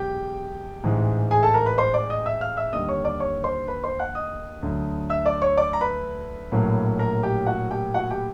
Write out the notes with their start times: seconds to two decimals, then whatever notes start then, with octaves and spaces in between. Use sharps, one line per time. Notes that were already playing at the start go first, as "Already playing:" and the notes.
Already playing: E1 E2 B2 F#3 G4 G5
0.84 A1 G#2 E3 G#3
1.31 G#4 G#5
1.43 A4 A5
1.54 A#4 A#5
1.66 B4 B5
1.78 C5 C6
1.94 D5 D6
2.10 D#5 D#6
2.26 E5 E6
2.41 F5 F6
2.57 E5 E6
2.73 D#2 D3 G3 D#5 D#6
2.89 C#5 C#6
3.04 D5 D6
3.20 C#5 C#6
3.44 C5 C6
3.68 B4 B5
3.84 C5 C6
3.99 F#5 F#6
4.15 D#5 D#6
4.63 D2 D3 F#3
5.10 E5 E6
5.26 D5 D6
5.42 C#5 C#6
5.57 D5 D6
5.73 A#5
5.81 B4 B5
6.52 A#1 A2 F#3 A#3
6.99 A#4 A#5
7.23 G4 G5
7.47 F#4 F#5
7.71 G4 G5
7.94 F#4 F#5
8.11 G4 G5